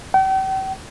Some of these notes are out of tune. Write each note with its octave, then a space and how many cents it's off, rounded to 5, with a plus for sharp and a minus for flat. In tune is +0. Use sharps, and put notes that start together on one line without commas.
G5 -40